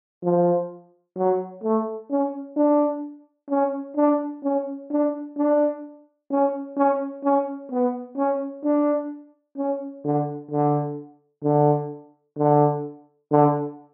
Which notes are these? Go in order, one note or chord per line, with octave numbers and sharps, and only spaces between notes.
F3
F#3
A3
C#4
D4
C#4
D4
C#4
D4
D4
C#4
C#4
C#4
B3
C#4
D4
C#4
D3
D3
D3
D3
D3